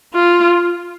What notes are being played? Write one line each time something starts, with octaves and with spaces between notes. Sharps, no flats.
F4